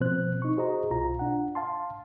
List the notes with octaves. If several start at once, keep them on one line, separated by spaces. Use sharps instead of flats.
B2 F3 C4 C5 F#6
D#4 C#6
F#4 G#4 C5 D#5 A#5
C2 B2 F4 A#5
D4 F#5
F5 A5 C6